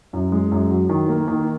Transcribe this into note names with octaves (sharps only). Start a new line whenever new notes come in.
F#2
G#3
F#2
F#3
D#3
A#3
D#3